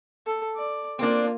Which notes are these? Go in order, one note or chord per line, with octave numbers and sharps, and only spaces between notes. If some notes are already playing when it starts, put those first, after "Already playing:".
A4
D5
A#3 C4 D4 F4